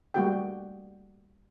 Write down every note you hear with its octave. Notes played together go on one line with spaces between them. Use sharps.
G3 A3 A#3 F#4 G#4 G5